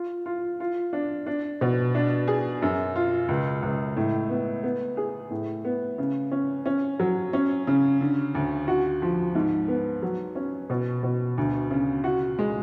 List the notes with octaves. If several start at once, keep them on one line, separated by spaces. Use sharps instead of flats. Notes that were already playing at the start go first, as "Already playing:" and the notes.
Already playing: F4
F4
F4
D4
D4
B2
D4
G#4
F#2
F4
C#2
C#2
A2
B3
B3
G#4
A2
B3
C#3
C#4
C#4
F#3
C#4
C#3
D3
D2
F#4
F3
G#2
B3
F#3
C#4
B2
B2
D2
C#3
F#4
G#3